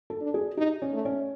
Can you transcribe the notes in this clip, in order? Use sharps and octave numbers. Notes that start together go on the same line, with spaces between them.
A4
D4
G#4
D#4 G4
C#4
A3
C#4